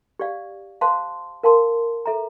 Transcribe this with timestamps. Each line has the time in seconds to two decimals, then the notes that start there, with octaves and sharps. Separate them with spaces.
0.19 G4 D5 F5
0.81 C5 F5 A5 C6
1.43 A#4 F5 A5 C6
2.06 A4 E5 A#5